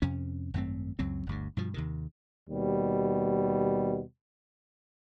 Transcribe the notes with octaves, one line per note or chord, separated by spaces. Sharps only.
F2 C3 C#4
G#1 F#2 A3 C4
C#2 F#2 F#3 C4
G1 D2 G2
G2 B2 F3
D#2 C3 D#3
D#2 B2 G3